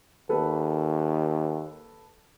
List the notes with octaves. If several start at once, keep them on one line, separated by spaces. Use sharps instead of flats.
D#2 A4 B4